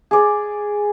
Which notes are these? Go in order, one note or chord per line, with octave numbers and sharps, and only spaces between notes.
G#4 D5